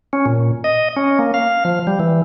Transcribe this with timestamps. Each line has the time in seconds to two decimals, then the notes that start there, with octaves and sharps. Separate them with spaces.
0.13 C#4
0.26 A#2
0.64 D#5
0.96 C#4
1.19 A#3
1.34 F5
1.65 F3
1.87 G3
2.00 E3